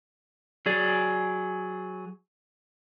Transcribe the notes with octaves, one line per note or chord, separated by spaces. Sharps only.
F#3 G#4 D5